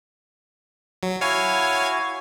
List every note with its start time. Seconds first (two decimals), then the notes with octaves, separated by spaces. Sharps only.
1.03 F#3
1.21 E4 F#4 C#5 F5 G#5